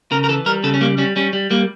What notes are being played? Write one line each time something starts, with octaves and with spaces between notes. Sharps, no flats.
C#3 A#4
A#4
E3 A4
G3 A#4
C#3 A4
C#4
G3 A#3
G3 C#4
G3 C#4
G3
G3 A#3